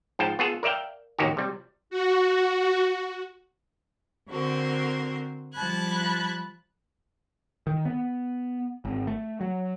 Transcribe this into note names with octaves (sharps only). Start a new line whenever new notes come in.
G#2 F3 G5 A5
B3 F4 G#4 A4
A#4 D5 E5 F5 G5
A1 D#2 D#3 F#4 G4
C3 G3
F#4
D3 C4 F#4 A#4 C5
F3 G3 A5 B5 F#6 G#6
D#3
B3
G#1
A3
F#3